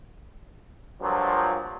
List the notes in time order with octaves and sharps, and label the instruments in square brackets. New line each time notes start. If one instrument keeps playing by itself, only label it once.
[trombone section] G2 A#2 F3 F#3